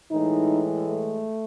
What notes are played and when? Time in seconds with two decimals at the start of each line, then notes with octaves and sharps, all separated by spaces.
0.10 A2 E3 G#3 D#4
0.85 A3